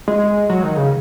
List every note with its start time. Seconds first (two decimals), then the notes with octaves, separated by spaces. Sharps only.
0.08 G#3
0.49 F#3
0.63 D#3
0.77 C#3